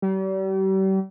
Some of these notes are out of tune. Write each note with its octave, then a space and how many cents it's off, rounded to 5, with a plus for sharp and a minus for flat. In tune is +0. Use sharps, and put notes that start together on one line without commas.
G3 -40